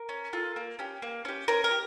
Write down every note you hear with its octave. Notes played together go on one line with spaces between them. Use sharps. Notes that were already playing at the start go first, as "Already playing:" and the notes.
Already playing: A#4
C#4
F4 A4
A#3
C#4 G4
A#3
C#4 G4
C#4 A#4
A#4
G4